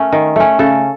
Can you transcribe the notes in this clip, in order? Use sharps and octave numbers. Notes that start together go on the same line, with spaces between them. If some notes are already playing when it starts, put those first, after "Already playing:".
Already playing: A3 C#4 A#4
D#3
A3 C#4
C#3 A4